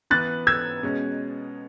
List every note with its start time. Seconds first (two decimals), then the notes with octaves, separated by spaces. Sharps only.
0.10 E3 B3 F#6 A6
0.47 E6 G#6
0.83 B2 G#3 C#4